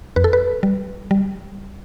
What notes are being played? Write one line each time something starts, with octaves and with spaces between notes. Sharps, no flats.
F2 B4
A4
B4
G3
G3